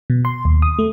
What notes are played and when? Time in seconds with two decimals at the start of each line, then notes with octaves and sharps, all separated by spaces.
0.10 B2
0.25 C6
0.45 D#2
0.62 D#6
0.79 A3